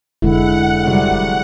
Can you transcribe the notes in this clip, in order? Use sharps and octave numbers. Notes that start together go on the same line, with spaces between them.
F1 D3 G#3 E4 F#5
C3 F#3 G3